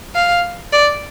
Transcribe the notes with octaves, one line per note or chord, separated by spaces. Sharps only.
F5
D5